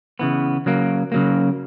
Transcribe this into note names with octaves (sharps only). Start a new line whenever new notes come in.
C#3 E3 B3
C#3 F#3 A#3
C#3 F#3 A#3